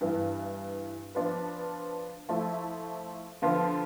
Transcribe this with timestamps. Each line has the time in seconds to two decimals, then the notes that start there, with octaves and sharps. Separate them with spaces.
0.01 G2 E3 B3
1.15 F3 B3 D4 F4 B4
2.29 F3 A3 E4
3.42 D3 F3 B3 F4